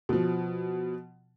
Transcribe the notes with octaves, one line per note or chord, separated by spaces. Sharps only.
B2 F3